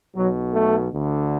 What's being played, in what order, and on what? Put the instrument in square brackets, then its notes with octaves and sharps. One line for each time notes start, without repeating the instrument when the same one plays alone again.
[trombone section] B1 B2 F#3
A3
D2 D3